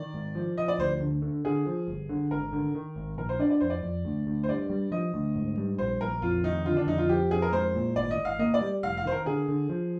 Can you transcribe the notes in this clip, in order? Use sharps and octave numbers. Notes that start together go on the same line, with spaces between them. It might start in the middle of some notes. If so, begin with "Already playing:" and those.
Already playing: D#3 D5
G#2
F3
F3 D#5
D5
D2 C5
D3
D3
D3 G#4
F3
G1
D3
G#1 A#4
D3
D#3
G#1
A#1 A#4
C5
D4 D5
D5
F2 C5
D5
F2
D2
D2
C5
G2 D5
G3
F3 D#5
D2
G#2
G3
A#1 C5
A#1 A#4
F2 F4
D#3 D#4
D3 F4
D4
F2 D#4
F4
F3 G4
F2 G#4
A#4
G#3 C5
A#2
G#1 D5
D#5
G#1
F5
A#3 D#5
D5
G3
F1 F5
F5
D#3 C5
A#4
D3 G#4
D3
F3